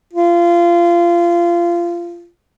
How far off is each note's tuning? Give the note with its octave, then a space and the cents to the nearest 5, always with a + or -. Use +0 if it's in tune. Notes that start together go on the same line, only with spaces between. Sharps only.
F4 -25